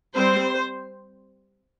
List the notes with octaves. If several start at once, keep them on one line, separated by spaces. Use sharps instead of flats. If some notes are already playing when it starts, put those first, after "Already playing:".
G3 C4 C5